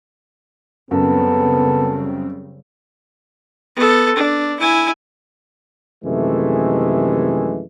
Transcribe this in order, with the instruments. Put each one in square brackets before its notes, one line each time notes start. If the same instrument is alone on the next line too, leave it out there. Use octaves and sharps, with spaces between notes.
[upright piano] F#2 [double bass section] C#3 G3 C4 [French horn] B3 [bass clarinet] A4
[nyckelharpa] B3 A4
D4
E4 G#5
[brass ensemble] F#2 C3 D#3 E3 G#3 A3